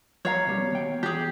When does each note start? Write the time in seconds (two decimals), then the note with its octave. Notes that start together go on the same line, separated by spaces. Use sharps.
0.25 F3 C#5 F5 A#5
0.47 B2 G3
0.71 D#2 B2 G5
1.03 E2 G4 G#4